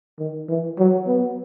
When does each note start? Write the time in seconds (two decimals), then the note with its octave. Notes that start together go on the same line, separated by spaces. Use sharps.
0.19 D#3
0.49 E3
0.78 F#3
1.07 B3